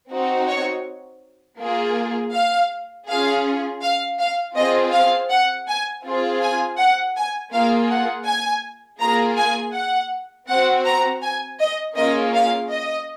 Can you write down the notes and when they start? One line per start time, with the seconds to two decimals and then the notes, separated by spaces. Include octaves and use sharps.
0.11 C4 D#4 F#4
0.49 C#5
1.59 A#3 F4 G#4
2.33 F5
3.08 C#4 F4 G#4 F5
3.82 F5
4.19 F5
4.56 C4 F4 G#4 D#5
4.92 F5
5.30 F#5
5.68 G#5
6.05 C4 F4 G#4
6.41 G#5
6.78 F#5
7.16 G#5
7.52 A#3 F4 G#4 F5
7.90 F#5
8.26 G#5
9.00 A#3 F4 G#4 A#5
9.37 G#5
9.74 F#5
10.49 C4 F#4 F#5
10.86 A#5
11.22 G#5
11.59 D#5
11.96 A#3 C#4 F4 G#4 D#5
12.34 F5
12.70 D#5